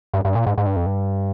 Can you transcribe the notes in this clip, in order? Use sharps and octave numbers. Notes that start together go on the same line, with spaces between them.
G2
G2
A#2
G#2
G#2
G2
F2
G2